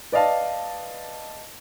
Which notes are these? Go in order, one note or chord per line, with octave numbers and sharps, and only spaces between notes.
B4 D5 D#5 F5 A5